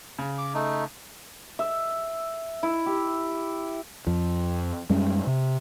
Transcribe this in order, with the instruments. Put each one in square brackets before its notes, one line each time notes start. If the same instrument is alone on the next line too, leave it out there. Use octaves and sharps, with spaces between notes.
[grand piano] C#3
[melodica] D6
A3 D#4
[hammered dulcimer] E5
E4
G4
[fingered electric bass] F2 F3
F#2 G3 G#3 C#4
C3